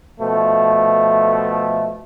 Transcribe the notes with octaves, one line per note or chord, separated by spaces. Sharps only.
B2 F3 A3